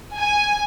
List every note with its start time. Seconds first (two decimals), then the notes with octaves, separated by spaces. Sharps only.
0.15 G#5